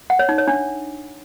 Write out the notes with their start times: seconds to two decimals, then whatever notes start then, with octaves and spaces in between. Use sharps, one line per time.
0.10 F#5
0.19 C#5
0.29 D#4
0.38 C#5
0.47 D4